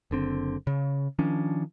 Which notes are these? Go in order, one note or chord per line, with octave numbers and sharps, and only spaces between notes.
F#1 D3 C4
C#3
D#3 F3 C#4 D4